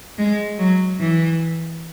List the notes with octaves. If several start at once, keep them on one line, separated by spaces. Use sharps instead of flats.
G#3
F#3
E3